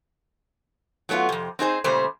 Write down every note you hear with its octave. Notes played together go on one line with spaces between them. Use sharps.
F#3 A3 B3 D4 F4
F2 C3
C4 D#4 G#4 C5
A#2 C#3 G3 A3 C5